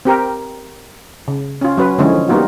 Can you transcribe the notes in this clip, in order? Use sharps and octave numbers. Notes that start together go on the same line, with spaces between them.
C4 G4 A#4
C#3
C#4 F4
F#3 C#4 B4
D3 E3 F3 G#3 C#4
G3 A#3 B3 D#4 F4 F#4